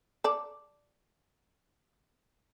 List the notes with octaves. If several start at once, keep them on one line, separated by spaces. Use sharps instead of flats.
A4 D5